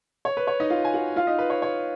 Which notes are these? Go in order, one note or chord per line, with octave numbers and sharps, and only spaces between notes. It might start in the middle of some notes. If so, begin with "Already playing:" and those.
C#5
B4
C#5
D#4 D#5
F4 F5
G#5
F#4 F#5
F4 F5
D#4 D#5
B4
C#5
C#5